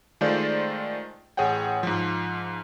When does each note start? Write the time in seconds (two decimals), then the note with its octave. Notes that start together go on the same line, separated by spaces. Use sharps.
0.21 D#3 G#3 A3 F4 C5 D5
1.37 A1 G#4 C#5 F#5 G5
1.83 G#2 F3